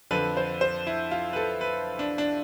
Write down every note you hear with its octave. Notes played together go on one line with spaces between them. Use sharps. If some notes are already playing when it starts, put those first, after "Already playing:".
F2 D3 F3 B4
C5
C5
E4
F4
B4
A4
B4
D4
D4